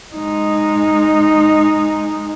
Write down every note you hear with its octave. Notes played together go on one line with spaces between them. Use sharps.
G#3 D#4